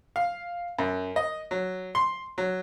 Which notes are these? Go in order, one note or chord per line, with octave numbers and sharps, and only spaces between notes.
F5
F#2
D#5
F#3
C6
F#3